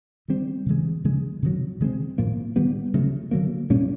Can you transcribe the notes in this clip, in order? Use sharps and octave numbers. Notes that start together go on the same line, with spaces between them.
D#3 G3 C4
C#3 E3 G#3
C#3 F3 G#3
C3 D#3 F#3
D#3 G#3 C4
A2 F3 A#3
D#3 G3 B3
C#3 F#3 A3
D3 F#3 A#3
A#2 G3 A#3 C#4